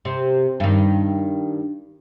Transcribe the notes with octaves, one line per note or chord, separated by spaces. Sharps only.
C3
G2 D#3